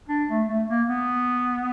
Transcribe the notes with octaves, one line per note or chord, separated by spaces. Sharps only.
D4
A3
A3
A#3
B3